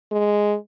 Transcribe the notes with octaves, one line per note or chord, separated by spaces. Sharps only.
G#3